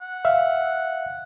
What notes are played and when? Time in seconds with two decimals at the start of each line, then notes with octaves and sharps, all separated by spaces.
0.01 F#5
0.25 E5 F5